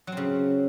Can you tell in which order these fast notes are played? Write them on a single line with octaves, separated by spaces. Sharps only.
F#3 C4 C#3